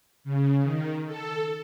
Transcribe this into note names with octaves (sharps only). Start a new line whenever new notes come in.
C#3
D#3
A4